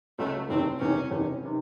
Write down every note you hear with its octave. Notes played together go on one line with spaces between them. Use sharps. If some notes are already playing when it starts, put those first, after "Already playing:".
C#2 C#3 F#3 A3
F#1 E2 C3 D#3 C4
F#1 E2 C3 D#3 C#4
F#1 E2 C3 D#3
C3 D#3